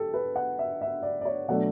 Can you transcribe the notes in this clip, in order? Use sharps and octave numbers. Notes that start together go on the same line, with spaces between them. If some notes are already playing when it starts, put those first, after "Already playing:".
Already playing: G4 A4
B4
F#5
E5
E5
D5
D5
C#5
B2 F#3 A3 D4 F#5